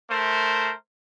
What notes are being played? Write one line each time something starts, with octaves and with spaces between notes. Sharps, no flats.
A3 A#4 C5